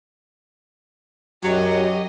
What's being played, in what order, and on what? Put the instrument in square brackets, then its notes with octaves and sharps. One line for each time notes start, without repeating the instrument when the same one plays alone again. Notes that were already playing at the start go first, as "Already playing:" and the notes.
[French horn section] F#2 [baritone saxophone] F#3 [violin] G4 D#5